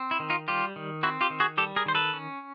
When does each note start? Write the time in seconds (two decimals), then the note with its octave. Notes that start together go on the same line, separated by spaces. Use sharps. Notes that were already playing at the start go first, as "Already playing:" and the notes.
Already playing: C4
0.11 E4
0.20 D#3
0.30 D#4 F4
0.48 G3 F4 G4
0.76 D#3
1.03 C4 E4 F#4
1.21 F4 G4
1.30 D#3
1.40 F#4 G#4
1.57 G3 G4 A4
1.76 G#4 A#4
1.86 D#3 C5
1.95 A4 B4
2.13 C#4